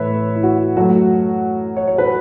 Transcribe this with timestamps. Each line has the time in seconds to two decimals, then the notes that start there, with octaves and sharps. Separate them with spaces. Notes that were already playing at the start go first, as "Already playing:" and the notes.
Already playing: A2 E3 A3 B4 C#5 E5
0.35 E4
0.43 F#4
0.76 F#2 F#3 A3 F#4
1.77 C#5
1.88 C#5
1.98 B4